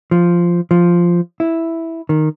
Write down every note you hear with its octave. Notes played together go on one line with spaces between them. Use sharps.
F3
F3
E4
D#3